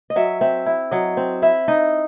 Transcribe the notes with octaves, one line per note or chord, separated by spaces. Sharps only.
D#5
F#3 E5
C4 E5
E4
F#3 D#5
C4
E4 E5
D#4 D#5